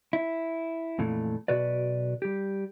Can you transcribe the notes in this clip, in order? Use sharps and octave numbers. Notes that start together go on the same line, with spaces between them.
E4
F2 A#2 E3 A3
B1 B2 F#4 B4 D5
G3 G4